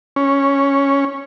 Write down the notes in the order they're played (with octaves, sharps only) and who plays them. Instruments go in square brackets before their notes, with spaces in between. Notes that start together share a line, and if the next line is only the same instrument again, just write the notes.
[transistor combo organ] C#4